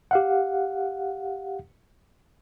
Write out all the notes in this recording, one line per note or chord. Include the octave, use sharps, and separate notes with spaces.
G4 F5 F#5